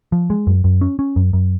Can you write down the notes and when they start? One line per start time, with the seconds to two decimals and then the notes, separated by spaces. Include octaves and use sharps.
0.12 F3
0.30 G#3
0.47 F#2
0.64 F#2
0.81 C#4
0.99 C#4
1.16 F#2
1.33 F#2